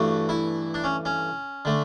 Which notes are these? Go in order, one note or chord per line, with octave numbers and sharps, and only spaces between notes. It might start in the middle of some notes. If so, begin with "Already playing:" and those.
Already playing: G2 E3 A3 F#4
E4
D4
C#4
C#4
D3 A3